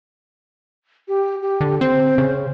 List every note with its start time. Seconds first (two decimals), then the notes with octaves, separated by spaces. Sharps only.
1.08 G4
1.42 G4
1.61 D3
1.81 C4 C5
2.18 C#3